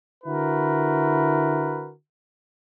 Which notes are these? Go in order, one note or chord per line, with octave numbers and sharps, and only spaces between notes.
D3 E4 F#4 A#4 B4